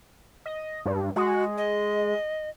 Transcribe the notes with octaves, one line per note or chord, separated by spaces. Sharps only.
D#5
G2
G#3 F#4
D#5